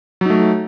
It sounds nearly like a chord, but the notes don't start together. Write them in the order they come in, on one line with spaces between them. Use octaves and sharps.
F#3 D#4 A3